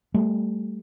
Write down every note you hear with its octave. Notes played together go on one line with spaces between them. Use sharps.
G3 A3